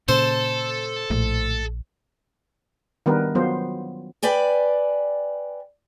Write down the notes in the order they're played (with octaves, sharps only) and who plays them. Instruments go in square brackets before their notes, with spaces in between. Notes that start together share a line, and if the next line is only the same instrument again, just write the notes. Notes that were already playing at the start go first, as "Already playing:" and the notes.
[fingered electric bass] A#2 C#3 [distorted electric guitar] A4 [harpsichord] C5
[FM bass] A#1 [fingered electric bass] A2
[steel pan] D#3 G3 B3 D4 A#4 B4
F#3 B3 F4 C5
[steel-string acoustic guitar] B4 D5 G5 G#5